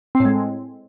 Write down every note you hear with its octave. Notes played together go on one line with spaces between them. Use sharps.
C4
A2
G#3